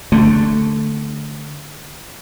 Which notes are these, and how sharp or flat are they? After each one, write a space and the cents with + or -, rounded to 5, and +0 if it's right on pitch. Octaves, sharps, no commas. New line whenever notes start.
D3 +0 A3 +0